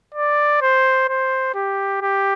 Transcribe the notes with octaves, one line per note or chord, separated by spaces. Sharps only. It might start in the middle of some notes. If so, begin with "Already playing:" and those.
D5
C5
C5
G4
G4